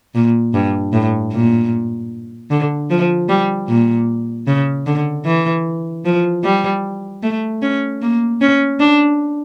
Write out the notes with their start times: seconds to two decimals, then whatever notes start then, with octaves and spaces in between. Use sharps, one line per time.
0.15 A#2
0.54 G2
0.93 A2
1.32 A#2
2.50 D3
2.90 F3
3.29 G3
3.68 A#2
4.47 C#3
4.86 D3
5.25 E3
6.05 F3
6.44 G3
7.23 A3
7.62 C#4
8.02 A#3
8.41 C#4
8.80 D4